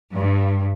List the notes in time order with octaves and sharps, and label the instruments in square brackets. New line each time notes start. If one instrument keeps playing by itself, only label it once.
[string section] G2